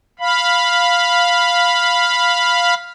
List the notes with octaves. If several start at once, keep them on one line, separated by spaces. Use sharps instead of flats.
F5 B5